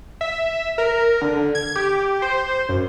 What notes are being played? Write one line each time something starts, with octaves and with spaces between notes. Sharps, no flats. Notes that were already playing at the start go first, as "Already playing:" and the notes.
E5
A#4
D3
G#6
G4
C5
F#2